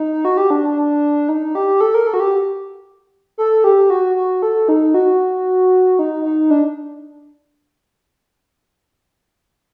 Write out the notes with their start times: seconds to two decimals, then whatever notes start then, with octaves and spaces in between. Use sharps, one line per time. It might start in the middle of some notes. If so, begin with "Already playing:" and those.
Already playing: D#4
0.25 F#4
0.37 G4
0.50 D4
0.63 D4
0.76 D4
1.29 D#4
1.55 G4
1.81 A4
1.94 A#4
2.07 A4
2.14 F#4
2.20 G4
3.38 A4
3.64 G4
3.90 F#4
4.16 F#4
4.42 A4
4.69 D#4
4.94 F#4
5.99 D#4
6.25 D#4
6.50 D4